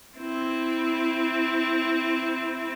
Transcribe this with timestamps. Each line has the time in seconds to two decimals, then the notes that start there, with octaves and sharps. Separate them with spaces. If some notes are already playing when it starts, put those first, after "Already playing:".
0.17 C4 E4